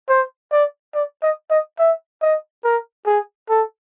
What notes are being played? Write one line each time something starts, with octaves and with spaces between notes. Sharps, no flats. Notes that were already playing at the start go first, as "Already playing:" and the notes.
C5
D5
D5
D#5
D#5
E5
D#5
A#4
G#4
A4